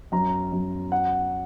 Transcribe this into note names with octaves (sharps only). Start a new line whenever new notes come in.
F#2 A#5
F#2
F#5